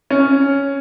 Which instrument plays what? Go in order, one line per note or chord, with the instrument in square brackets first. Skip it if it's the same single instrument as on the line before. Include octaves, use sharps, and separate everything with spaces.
[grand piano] C#4